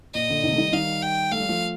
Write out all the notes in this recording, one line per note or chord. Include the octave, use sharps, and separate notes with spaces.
A#2 D#5
A#2 D3
C3 D#3
A3
D#3 G3
D#3 G3 F5
G5
A3 F5
G3
F3 A3